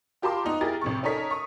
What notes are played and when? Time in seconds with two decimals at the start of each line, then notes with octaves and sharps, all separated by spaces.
0.22 F4 G4 A#4 A5 C6 D6
0.45 B3 D#4
0.61 E4 G4 G#4 A#4 A6
0.81 A1 C3 C#6
1.03 C#4 D#4 A4 A#4 C#5 B6
1.30 C#6 D#6